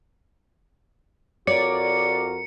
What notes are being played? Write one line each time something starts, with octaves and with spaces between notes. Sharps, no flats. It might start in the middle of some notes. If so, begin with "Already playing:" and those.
F2 F#4 A#4 C#5 D5 C#7